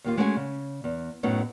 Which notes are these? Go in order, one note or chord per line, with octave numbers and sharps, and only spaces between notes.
D#2 A#3 F4
G#3 A3 C#4 F#4 D#5 G#5
C#3
E2
F#2 A2 F#3 B3 D#4